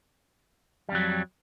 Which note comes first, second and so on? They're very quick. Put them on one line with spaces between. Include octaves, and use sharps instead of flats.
G3 F2 F#3